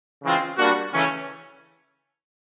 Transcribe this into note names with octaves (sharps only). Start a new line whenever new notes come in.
C#3 E3 G#3 C4 F4
G3 A#3 D4 F#4
C#3 E3 A3 C#4